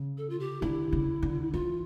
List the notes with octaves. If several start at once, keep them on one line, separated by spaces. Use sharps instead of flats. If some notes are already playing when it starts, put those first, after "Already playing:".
Already playing: C#3
A4
F4
G4
D3 E4
C#3
D3
E3 F4